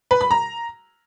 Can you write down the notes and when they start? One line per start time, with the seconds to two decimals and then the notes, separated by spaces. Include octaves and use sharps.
0.11 B4
0.21 B5
0.31 A#5